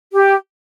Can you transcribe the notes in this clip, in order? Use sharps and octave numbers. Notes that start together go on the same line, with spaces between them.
G4